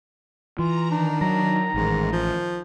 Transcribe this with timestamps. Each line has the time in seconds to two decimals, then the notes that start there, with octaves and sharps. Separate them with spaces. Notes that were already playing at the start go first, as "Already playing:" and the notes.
0.59 E3 F4 A#5
0.91 D#3 D4 D#4
1.21 F#3 A#5
1.74 A1 G#2
2.12 F3